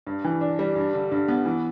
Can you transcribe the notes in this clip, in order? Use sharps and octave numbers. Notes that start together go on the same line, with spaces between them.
G2
E3
D4
G3
G2
D3
G2
B3
E3